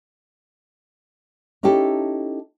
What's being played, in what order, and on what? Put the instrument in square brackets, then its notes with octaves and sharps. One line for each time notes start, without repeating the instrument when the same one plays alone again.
[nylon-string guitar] C#4 D#4 E4 G4 A4